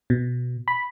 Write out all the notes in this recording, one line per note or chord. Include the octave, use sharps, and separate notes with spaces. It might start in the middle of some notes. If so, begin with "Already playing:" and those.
B2
B5